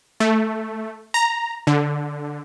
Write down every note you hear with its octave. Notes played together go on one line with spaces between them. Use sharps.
A3
A#5
D3